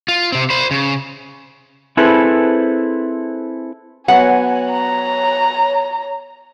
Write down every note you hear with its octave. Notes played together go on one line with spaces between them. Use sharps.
F4
C3 C4
C5 B5
C#3
C4 E4 G#4 A4 B4 C5
F#3 B3 F#4 C#5 F#5 G#5
A#5